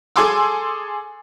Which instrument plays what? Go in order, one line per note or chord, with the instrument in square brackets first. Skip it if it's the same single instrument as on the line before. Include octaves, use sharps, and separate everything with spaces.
[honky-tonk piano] G#4 A4 G#5 C6 D6 E6